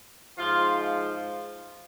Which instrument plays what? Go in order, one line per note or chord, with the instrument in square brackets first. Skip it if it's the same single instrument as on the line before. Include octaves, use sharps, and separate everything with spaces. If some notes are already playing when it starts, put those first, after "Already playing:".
[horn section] G#2 F3 F4